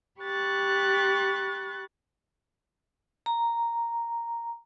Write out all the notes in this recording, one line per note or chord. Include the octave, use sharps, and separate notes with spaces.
G4 B5 C#6 F#6 A6
A#5